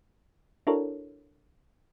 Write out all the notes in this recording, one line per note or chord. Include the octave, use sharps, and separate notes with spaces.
D4 E4 F#4 A4 A#4 C#5